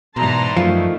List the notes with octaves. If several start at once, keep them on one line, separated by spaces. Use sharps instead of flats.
G#2 B2 E3 G3 A5 A#5 C6
F#2 D#3 F3 A3